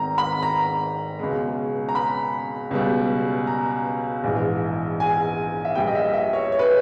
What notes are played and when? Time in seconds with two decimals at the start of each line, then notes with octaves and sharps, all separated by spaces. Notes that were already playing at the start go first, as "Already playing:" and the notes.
Already playing: G#1 G#2 D#3 A#5
0.18 B5
0.43 A#5
1.19 C#2 B2 G#3
1.89 A#5
1.95 B5
2.71 C#2 B2 G3
3.47 A#5
4.24 A#1 G#2 E3
5.00 G#5
5.65 E5
5.75 A#1 A#2 G3 G5
5.87 D#5
5.95 E5
6.14 E5
6.33 C#5
6.52 C#5
6.59 B4